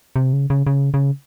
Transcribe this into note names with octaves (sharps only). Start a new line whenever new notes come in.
C3
C#3
C#3
C#3
C#3